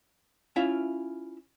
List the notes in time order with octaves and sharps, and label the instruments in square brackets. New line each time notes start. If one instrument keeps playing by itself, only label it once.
[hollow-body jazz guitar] C#4 E4 F4 E5 F5